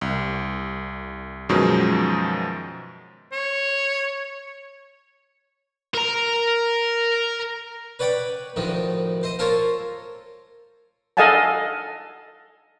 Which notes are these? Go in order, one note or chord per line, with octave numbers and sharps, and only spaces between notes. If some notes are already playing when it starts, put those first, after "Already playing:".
C2
F#2 B2 D#3 F3 G#3 C#4
C#5
A#4 A#5
B4 C#5 D5 F#5 G5 B5
D2 A2 D#3 F3
C5 D#5
F4 A4 A#4 C5 C#5
A4 D#5 F5 F#5 G#5 A5